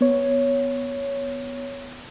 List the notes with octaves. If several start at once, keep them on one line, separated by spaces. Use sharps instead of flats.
B3 C#5